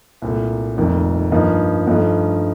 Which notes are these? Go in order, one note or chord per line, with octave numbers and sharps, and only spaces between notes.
C2 A#2 A3
F1 F2 D#3 A#3
G2 F3 A#3 D#4
G2 F3 A3 D#4